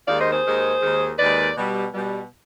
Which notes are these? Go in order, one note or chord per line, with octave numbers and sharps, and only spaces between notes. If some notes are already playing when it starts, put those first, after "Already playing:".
D#2 D#3 G#3 D5 F5
C5 D#5
G#4 C5
D#2 D#3 G#3
D#2 D#3 G#3
D#2 D#3 G#3 B4 D5
B2 G3
B2 G3